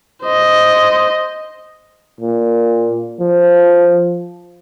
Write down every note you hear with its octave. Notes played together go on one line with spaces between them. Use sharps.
C5 D#5
A#2
F3